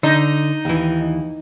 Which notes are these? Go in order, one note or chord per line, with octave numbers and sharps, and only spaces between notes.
D3 D#4
D#2 E3